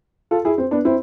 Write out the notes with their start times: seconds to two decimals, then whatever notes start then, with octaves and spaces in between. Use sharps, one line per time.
0.31 F4 A4
0.45 E4 G#4
0.58 C4
0.71 B3 D4
0.85 C4 E4